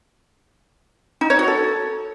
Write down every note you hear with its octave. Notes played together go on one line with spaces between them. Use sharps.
D#4
C#5
F#4
A4